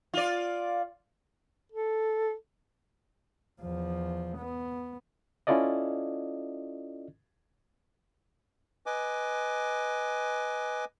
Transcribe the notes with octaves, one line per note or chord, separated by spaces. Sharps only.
F4 D5
A4
E2 F3
B3
C#4 E4 F4 A4 D5 D#5
B4 D#5 G#5 D6